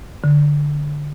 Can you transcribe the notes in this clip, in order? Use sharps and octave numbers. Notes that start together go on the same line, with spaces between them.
D3